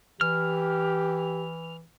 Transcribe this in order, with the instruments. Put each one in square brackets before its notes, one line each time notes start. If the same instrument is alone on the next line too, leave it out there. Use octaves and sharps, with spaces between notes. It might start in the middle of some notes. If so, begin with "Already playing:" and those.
[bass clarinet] E3 [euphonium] G4 [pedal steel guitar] F6